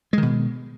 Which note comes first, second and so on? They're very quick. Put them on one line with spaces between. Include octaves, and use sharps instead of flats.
G#3 D#3 B2